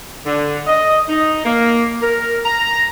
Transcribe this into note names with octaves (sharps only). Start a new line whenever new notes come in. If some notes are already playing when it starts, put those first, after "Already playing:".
D3
D#5
D#4
A#3
A#4
A#5